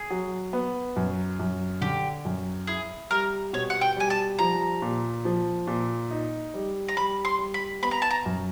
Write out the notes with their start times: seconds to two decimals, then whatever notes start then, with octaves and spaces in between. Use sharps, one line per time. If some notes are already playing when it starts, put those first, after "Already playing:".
Already playing: G#4
0.10 F#3
0.53 B3
0.96 F#2
1.40 F#2
1.81 D3 G4
2.25 F#2
2.67 E4 G#4
3.10 G3 A#4
3.53 B2 C#5
3.70 F#5
3.81 G5
3.97 G3 G#5
4.10 A5
4.39 F3 A#5
4.82 A#2
5.25 F3
5.67 A#2
6.11 D#4
6.54 G3
6.88 A#5
6.96 G3 B5
7.25 C6
7.39 G3
7.54 B5
7.82 B3 B5
7.91 A#5
8.02 A5
8.11 A#5
8.26 F#2